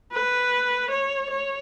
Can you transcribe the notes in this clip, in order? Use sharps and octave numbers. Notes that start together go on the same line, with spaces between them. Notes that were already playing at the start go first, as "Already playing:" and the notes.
B4
C#5
C#5